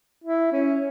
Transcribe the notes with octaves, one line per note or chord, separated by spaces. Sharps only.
E4
C#4